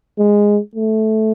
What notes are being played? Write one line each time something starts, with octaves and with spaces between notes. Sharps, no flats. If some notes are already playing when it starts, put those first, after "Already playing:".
G#3
A3